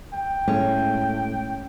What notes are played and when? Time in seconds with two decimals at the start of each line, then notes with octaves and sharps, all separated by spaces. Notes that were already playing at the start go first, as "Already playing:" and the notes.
0.13 G5
0.48 A2 G#3 C#4